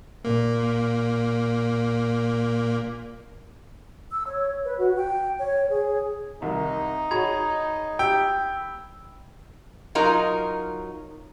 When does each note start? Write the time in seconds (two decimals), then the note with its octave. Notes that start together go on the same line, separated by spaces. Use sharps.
0.24 A#2 A#3
4.11 E6
4.26 C#5
4.64 B4
4.79 F#4
4.97 G5
5.38 C#5
5.70 G#4
6.42 C2 D#3 D#4
7.11 F#4 G#4 C#5 B5 G#6
7.99 G4 G5 E6
9.95 F#3 D#4 F4 A#4